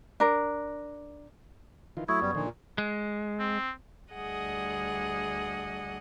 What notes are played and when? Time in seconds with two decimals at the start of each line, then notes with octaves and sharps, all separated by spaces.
0.20 D4 A#4
1.97 D#3 E3 F4
2.08 F#3 A3 E4 C#6 D#6 G#6
2.22 F#2 G3 B3
2.35 A#2 D3 D#3 F3
2.78 G#3
3.39 C4
4.13 D2 G3 G#4 D#5 F#5